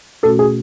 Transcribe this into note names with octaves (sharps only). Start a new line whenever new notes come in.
B2 A3 C#4 F#4 A4
G#4